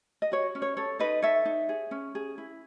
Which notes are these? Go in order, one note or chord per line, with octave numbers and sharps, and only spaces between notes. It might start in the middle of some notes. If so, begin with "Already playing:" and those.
D#5
F#4 C#5
C#4
C#5
A4 C#5
D#4 B4 D#5
A4 C#5 E5
D#4
G#4
C#4
G#4
E4